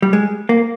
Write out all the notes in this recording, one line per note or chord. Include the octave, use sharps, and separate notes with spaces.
G3
G#3
A#3